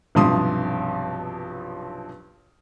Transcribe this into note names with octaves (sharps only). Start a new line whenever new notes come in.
B1 G2 C3 F3 C6 D#6